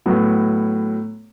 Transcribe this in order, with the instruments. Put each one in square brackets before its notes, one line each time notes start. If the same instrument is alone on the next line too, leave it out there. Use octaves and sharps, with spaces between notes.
[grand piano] A2 F#3 B3